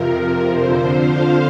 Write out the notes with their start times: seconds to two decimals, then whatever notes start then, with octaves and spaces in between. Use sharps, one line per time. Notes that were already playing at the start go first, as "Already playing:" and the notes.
Already playing: F2 C3 F3 A#4
0.48 F2 D3 F3 C5
0.93 F5